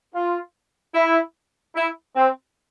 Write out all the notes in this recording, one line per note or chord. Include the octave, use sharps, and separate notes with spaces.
F4
E4
E4
C4